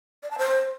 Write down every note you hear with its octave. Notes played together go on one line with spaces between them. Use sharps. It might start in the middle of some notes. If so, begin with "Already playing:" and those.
D5
A5
C5